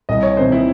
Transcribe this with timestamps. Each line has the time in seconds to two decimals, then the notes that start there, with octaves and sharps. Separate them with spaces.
0.09 C2 D#5
0.23 C#5
0.37 C3 E3 C4 D#4 C5
0.52 E4